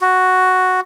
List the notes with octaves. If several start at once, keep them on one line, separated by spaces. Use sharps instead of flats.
F#4